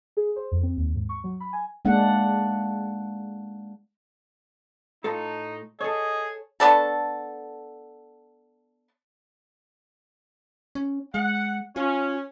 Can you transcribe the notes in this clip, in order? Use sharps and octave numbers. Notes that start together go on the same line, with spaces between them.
G#4
C5
F2
C4
D#2
G#2
C#6
F#3
B5
G#5
G#3 A#3 D4 F#5
A2 D#4 F4 A4
G#4 A4 C#5 D#5
A3 B3 D4 A4
C#4
G#3 F#5
C#4 F4